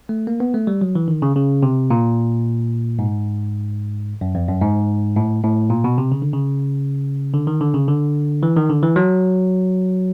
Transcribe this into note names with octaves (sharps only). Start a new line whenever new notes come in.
A3
A#3
B3
A3
G3
F#3
E3
D#3
C#3
C#3
C3
A#2
G#2
F#2
F2
F#2
G#2
A2
A2
A#2
B2
C3
C#3
D3
C#3
D3
D#3
D3
C#3
D3
E3
D#3
D3
E3
F#3